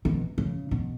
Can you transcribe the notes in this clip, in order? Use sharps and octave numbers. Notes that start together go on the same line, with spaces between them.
B2
C#3
B2